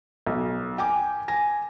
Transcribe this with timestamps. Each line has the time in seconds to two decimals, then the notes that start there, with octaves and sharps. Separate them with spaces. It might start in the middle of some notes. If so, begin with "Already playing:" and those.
0.27 B1
0.78 G5 G#5 D6
1.28 G#5 A#6